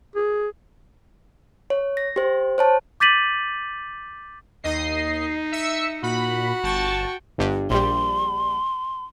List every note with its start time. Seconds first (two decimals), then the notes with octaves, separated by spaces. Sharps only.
0.16 G#4
1.70 C#5
1.97 A#6
2.16 G4 C5
2.58 C5 C#5 A5
3.00 D6 G6 A6 B6 D#7 F#7
4.63 D#2 D#4 D#5 C7
5.52 E5 E6 C#7
6.03 A#2 F#4 B5
6.63 G1 G5 A5 C#6
7.38 G1 G2
7.70 A#1 G3 C6